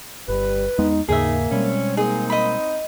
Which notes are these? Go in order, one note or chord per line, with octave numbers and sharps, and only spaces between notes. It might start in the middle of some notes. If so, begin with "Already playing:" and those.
G1 G3 B4
E2 G#3 B3 D#4
D#2 G#2 C#3 A#3 D#4 G#4 E5
B2 G3 G#3 C4 C#4
A#3 C4 D#4 G#4
D#5 B5